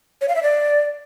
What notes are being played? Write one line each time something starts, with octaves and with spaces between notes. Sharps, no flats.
C#5
F5
E5
D5